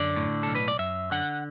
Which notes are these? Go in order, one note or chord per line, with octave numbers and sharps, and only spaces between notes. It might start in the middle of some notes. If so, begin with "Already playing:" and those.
Already playing: F#2 D3 D5
A2
B1 A4
B4
D5
F#2 E5
D3 F#5